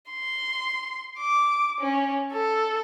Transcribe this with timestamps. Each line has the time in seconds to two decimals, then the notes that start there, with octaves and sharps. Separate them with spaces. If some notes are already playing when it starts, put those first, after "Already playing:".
0.11 C6
1.19 D6
1.81 C#4
2.32 A4